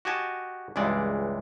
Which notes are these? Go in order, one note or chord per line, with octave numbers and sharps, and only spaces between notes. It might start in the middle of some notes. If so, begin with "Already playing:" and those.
F#4 G4 D#5 G#5 A5
C#2 G2 E3 G#3 D5